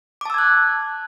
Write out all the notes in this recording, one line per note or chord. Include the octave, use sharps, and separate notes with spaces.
A5 D6 E6 F#6 G#6